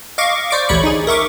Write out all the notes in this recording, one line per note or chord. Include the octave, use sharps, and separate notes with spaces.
D#5 F5 C#6 D6
C5 D5 C#6 D6
A1 D2 C#5 B5 C#6
D#4 G#4
A#4 E5 C#6 D6